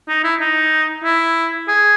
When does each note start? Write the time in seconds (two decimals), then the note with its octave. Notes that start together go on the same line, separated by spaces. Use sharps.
0.08 D#4
0.24 E4
0.40 D#4
1.04 E4
1.68 G#4